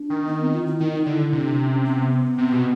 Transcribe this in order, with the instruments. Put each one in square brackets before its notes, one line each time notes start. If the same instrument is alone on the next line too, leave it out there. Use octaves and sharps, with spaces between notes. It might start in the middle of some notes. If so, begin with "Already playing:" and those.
Already playing: [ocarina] D4
[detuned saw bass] D#3
[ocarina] B3
C4
F4
E4
[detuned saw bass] D#3 [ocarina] D#4
[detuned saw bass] D3 [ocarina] E4
[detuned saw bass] C3 [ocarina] D4
[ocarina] C#4
B3
[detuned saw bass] C3
B2